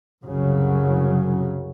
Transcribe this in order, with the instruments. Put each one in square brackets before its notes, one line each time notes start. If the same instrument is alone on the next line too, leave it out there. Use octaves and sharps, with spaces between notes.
[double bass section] C2 F#2 C#3 F#3